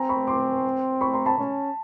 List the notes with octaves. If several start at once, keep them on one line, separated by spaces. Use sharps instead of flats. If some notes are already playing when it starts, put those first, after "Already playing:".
Already playing: C4 G#5 A#5
B5 C#6
C6 D6
B5 C#6
A#5 C6
A5 B5
C#4